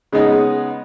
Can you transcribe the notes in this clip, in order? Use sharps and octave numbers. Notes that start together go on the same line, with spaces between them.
C#3 G#3 B3 D#4